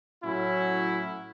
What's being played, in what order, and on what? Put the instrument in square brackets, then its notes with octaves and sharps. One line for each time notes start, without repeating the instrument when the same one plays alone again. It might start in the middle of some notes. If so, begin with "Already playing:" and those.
[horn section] A2 F#3 C#4 E4